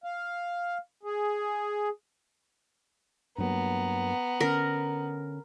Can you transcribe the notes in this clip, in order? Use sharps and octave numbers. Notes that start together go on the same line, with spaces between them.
F5
G#4
G2 F#3 A#3 B3 A#5
D3 C#4 A#4